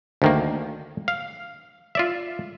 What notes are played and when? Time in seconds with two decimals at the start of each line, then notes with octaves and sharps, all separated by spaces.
0.22 D2 D#3 A#3
1.08 F5
1.95 F4 D5 E5